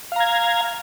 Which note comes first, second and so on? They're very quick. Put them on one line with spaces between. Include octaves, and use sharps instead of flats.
F5 A#5 G#6